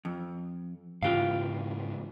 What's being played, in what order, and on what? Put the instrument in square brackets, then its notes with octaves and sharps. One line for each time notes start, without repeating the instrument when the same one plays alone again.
[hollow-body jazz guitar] F2
[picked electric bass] G#2 C#3 E3 [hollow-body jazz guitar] F4 G4 F5